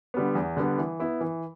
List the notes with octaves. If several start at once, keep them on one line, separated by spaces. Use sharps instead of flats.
D3 G3 B3
E2
D3 G3 B3
E3
B3 E4
E3